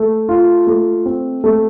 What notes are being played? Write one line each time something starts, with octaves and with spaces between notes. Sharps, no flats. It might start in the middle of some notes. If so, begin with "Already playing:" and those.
Already playing: A3
F4
A3
C4
A3